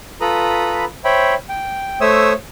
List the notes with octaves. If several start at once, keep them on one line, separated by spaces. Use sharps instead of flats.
F4 A4 B4 A#5 B5 D#6
C5 C#5 E5 G5 B5
G5
A3 C5 C#5 E5 D#6 E6